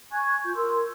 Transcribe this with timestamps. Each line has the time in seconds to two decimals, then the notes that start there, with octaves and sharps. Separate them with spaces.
0.11 G#5 C#6 F#6 G#6
0.44 F4 G6
0.55 A#4 C6 E6